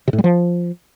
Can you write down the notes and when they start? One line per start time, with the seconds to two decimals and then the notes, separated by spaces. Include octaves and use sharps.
0.08 C3
0.13 A2
0.18 G3
0.24 F3